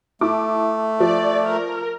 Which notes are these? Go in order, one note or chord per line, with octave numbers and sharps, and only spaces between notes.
A3 E4 A5 D6
F3 D5
A#4